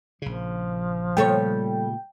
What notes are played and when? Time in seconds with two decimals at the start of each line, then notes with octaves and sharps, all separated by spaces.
0.22 A#1 C#3 F3
1.17 A#2 C#3 G3 A3 A4 C#5 G5